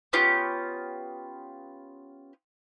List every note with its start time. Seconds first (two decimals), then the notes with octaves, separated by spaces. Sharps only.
0.13 B3 C#4 F4 G4